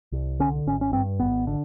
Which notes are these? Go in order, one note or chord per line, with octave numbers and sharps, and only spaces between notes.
C2
D3 C#4
G#1 C#4
C#4
G2 C4
G#1 B3
D3